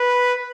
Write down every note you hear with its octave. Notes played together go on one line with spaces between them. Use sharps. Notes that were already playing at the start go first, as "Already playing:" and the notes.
Already playing: B4